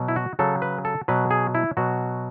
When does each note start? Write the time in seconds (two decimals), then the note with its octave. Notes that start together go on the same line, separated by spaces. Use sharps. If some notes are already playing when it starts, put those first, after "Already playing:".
Already playing: B2 F#3
0.08 E4
0.16 F#4
0.39 C#3 F#3 A4
0.62 B4
0.85 A4
1.08 B2 F#3 B4
1.31 G#4
1.55 E4
1.77 B2 F#3 F#4